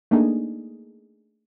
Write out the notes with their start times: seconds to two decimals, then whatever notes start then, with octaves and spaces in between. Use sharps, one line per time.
0.11 A3 A#3 D4 D#4 G#4